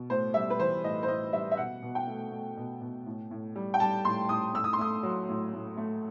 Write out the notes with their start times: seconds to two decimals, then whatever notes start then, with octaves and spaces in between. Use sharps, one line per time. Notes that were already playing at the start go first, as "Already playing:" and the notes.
Already playing: B2
0.10 A2 C5
0.34 G3 E5
0.50 B4
0.59 E3 C5
0.84 A2 D#5
1.03 C5
1.08 A2 D#5
1.33 G3 E5
1.51 E5
1.57 B2 F#5
1.82 B2
1.95 G5
2.07 A3
2.32 A3
2.57 B2
2.81 B2
3.06 A2
3.31 A2
3.56 G3
3.74 G5
3.80 G3 A5
4.05 A2 C6
4.29 A2 D#6
4.54 A2 E6
4.64 D#6
4.73 C6
4.79 A3 D#6
5.03 F#3
5.29 A2
5.54 A2
5.77 A3